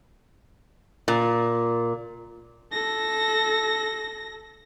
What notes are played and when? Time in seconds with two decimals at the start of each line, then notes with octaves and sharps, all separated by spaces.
1.08 A#2
2.72 A4 A#6